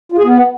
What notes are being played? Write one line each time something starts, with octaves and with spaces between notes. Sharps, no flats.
F4
G#4
B3